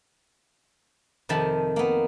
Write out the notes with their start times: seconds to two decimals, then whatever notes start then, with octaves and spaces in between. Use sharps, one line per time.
1.29 F2 C3 D#3 A5 B5
1.76 A#3 B3